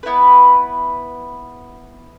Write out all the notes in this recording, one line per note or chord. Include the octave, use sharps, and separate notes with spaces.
B3 E4 B4